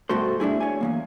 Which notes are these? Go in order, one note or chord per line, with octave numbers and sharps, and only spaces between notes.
G2 B2 A3 F#4 A4 C5
A3 D4 E4 G#4
C#5 G#5
E2 D#3 A#3